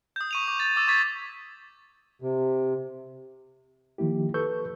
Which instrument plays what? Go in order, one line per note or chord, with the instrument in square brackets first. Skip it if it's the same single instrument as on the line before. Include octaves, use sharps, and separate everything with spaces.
[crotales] D#6 G6
C#6 D#7 F7
D6
A6
D6 E6 A6 E7
C#6 D6 G#6 A6 B6
[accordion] C3
[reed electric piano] D#3 F3 A#3 E4 G4
A4 B4 C#6 E6 G6